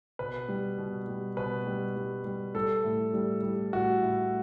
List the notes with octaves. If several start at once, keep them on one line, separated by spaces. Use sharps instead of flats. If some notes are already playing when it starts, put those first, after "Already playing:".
B2 B4
G3
B2
G3
B2 B4
G3
G3
G3
G3 A4
A2
G3
G3
A2 F#4
A2